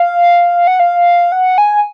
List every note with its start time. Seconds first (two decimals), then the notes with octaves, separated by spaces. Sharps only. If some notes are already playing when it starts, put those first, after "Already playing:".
Already playing: F5
0.67 F#5
0.80 F5
1.32 F#5
1.58 G#5